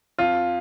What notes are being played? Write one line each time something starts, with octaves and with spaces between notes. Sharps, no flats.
F2 F4